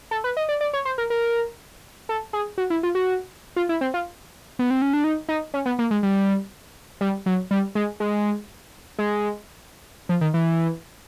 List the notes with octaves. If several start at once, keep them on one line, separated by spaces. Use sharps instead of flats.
A4
B4
D#5
D5
D5
C#5
C5
A#4
A#4
A4
G#4
F#4
E4
F4
F#4
F4
E4
C4
F4
B3
C4
C#4
D4
D#4
D#4
C#4
B3
A#3
G#3
G3
G3
F#3
G3
G#3
G#3
G#3
F3
D#3
E3